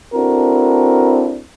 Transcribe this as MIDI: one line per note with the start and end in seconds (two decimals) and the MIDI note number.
0.14 1.41 60
0.14 1.41 62
0.14 1.41 64
0.14 1.41 66
0.14 1.41 69
0.14 1.41 70